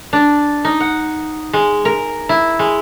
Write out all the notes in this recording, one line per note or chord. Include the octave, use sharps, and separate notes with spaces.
D4
D#4
F#5
G#3
A#4
E4
G#3